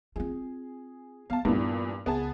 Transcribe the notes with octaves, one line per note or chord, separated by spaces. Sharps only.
C4 F4 G#4
B3 F5 A5
G2 A#2 E3 B3 D#4
C#2 B3 G#4 A5